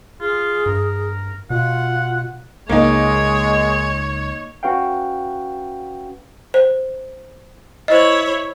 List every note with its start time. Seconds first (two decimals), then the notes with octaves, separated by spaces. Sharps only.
0.21 F4 G#4
0.66 G2 A#4
1.50 B2 F4 F#5
2.69 C#2 G#3 A#3 D#4 C#5
4.63 C#4 F#4 B4 F5 G5
6.54 C5
7.88 E4 C5 C#5 D#5